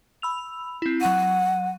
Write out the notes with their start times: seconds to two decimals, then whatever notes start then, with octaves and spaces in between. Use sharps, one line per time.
0.22 B5 E6 F7
0.82 C4 E4
1.01 F#3 F#5 D#7